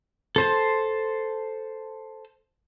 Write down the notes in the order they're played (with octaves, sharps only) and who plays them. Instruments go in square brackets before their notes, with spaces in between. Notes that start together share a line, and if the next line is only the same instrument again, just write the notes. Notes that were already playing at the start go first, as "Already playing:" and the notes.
[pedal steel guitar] A4 C5 A5